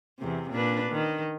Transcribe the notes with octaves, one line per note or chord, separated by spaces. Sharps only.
E2 C3
A#2 D4 B4
D#3